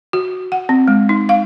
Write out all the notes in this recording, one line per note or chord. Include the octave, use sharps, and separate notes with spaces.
F#4
F#5
C4
G#3
D#4
F5